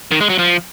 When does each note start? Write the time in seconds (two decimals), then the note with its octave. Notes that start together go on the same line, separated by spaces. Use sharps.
0.11 D#3
0.20 G#3
0.29 F#3
0.39 F3